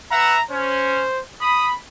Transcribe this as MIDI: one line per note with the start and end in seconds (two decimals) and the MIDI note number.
0.11 0.36 71
0.11 0.36 76
0.11 0.36 78
0.11 0.43 82
0.51 1.08 61
0.51 1.21 72
1.41 1.74 83
1.41 1.71 87